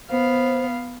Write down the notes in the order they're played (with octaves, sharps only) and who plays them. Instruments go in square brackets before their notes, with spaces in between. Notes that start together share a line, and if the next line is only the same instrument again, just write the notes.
[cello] B3 F5 [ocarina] C5